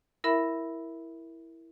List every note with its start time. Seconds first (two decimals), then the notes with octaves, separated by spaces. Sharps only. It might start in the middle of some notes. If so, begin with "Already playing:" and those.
0.24 E4 A#4 E5 B5